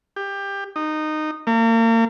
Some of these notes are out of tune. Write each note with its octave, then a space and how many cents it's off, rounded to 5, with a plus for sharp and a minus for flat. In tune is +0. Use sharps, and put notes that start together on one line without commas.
G4 +20
D#4 -15
A#3 -40